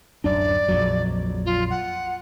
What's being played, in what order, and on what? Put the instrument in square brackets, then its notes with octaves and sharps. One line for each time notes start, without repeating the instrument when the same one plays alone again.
[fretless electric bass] D1 F#2 D4 [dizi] D5
[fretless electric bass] A#1 F2 F#3
[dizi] F4
F#5